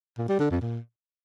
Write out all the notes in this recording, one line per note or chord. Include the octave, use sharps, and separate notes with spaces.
A#2
G3
D3
F2
A#2